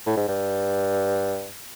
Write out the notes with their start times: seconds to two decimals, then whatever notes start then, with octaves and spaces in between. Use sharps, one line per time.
0.06 A2
0.17 G#2
0.28 G2